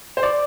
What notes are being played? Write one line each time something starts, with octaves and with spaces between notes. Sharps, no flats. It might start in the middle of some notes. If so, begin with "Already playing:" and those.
C5
D5